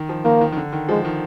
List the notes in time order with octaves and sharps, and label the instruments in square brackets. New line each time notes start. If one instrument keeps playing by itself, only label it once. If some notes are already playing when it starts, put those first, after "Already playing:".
Already playing: [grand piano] D#3
F3
[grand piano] D#3 [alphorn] A#3
[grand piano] D#3
D#3
D3
D#3
[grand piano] F3 [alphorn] G#3
[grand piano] D#3